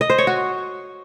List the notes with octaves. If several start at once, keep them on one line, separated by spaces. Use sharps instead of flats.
D#5
C5
C#5
F#4